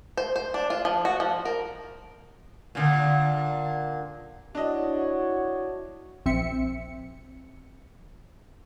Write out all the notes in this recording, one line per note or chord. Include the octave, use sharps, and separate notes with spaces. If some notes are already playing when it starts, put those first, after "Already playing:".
C5
C5
D4
F4
F3
F#4
F3
A#4
A#2 D3
D4 E4 F#4 C#5 D#5
A#1 C4 E5 C#7